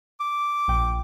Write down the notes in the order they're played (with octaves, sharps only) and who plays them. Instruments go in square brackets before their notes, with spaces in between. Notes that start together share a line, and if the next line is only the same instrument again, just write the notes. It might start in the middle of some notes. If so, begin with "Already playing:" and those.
[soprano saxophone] D6
[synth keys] A#1 G5